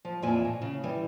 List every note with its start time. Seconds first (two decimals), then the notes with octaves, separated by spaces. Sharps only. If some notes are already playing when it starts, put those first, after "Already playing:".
0.05 F3
0.22 F2 A#2 E3 F4 E5 G#5
0.45 A2
0.62 C#3
0.84 E3 G3